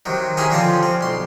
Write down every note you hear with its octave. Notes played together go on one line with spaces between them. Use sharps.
C3 D#3 F#3
C#4 E4 G4 G#4 A#4 G#5
D3 F3 C4 C#4 F4 A5
C4
B1 C6